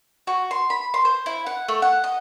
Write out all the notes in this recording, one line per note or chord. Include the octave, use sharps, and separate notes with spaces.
F#4
C6
B5
C6
C5
E4
F#5
A3
F#5
D#5